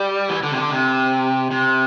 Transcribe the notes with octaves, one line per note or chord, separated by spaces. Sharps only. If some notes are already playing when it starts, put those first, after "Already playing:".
Already playing: G3
E3
D3
C3
D3
C3
C3